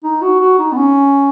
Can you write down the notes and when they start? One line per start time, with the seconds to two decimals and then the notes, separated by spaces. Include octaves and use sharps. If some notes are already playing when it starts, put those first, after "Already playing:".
0.04 D#4
0.22 F#4
0.40 F#4
0.58 D#4
0.72 B3
0.77 C#4